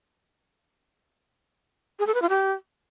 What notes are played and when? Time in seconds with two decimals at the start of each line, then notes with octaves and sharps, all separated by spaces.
1.99 G#4
2.07 A4
2.14 B4
2.22 F4
2.29 G4